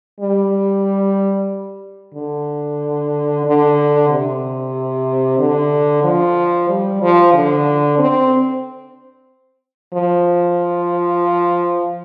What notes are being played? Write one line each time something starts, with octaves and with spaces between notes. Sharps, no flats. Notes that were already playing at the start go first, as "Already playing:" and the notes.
G3
D3
D3
C3
D3
F3
G3
F3
D3
C4
F3